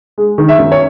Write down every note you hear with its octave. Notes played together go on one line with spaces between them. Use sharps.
G#3
D#3
E5
F#2
C#5